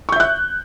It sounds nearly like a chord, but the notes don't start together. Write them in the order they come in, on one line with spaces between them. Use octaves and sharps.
C#6 G6 E5 F#6